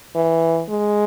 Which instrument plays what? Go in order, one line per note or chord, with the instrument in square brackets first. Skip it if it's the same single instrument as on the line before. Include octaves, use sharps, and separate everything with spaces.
[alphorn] E3
G#3